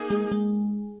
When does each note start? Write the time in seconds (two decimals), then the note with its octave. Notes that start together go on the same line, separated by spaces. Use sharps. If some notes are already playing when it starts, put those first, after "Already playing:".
Already playing: A#3 D#4 G#4
0.10 G#3
0.32 G#3